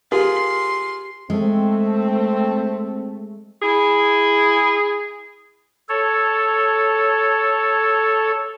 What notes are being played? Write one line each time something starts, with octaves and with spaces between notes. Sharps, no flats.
F4 G4 G#4 A#4 C6
G#3 A3 C4
E4 G#4
A4 C#5